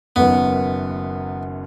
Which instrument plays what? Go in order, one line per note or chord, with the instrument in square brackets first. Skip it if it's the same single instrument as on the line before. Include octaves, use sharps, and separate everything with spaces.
[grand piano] F#1 F#2 D#3 F#3 [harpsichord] B3